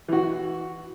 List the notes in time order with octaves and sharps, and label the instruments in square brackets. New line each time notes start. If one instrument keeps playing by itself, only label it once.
[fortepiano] E3 F#4